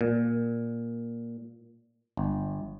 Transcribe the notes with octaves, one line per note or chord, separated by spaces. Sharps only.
A#2
G1